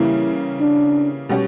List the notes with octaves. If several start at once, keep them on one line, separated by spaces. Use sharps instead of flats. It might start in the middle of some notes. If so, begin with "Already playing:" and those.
Already playing: C#3 E3 G3 A#3 E4
D4
B2 G3 C#4 G4